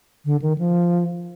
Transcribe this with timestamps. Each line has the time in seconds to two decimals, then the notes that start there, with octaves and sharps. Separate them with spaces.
0.25 D3
0.42 D#3
0.58 F3